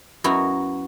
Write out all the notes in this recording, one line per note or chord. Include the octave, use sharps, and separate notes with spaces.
F#2 B3 E4 F#4 A#5